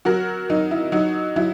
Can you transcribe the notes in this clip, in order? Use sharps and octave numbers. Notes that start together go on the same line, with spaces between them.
F#3 F#4 A#4
F#3 D#4
E4
F#3 D#4 F#4
F#3 E4